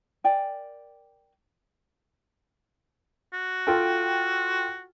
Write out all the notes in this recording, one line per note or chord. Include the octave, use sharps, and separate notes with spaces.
A#4 D5 G5 G#5
F#4
F4 A4 G5